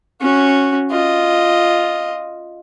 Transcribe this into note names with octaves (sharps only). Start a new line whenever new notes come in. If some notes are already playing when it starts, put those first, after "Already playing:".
C#4 F#4
F4 D#5